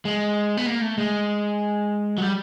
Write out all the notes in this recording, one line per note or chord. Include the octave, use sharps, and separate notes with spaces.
G#3
B3
A#3
A3
G#3
F#3
G3